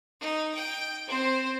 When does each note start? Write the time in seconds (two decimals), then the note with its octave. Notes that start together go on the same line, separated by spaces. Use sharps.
0.20 D#4
0.55 G5
1.07 C4 C5